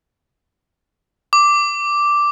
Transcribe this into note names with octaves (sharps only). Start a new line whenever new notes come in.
D6